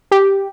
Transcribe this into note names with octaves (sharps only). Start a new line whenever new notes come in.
G4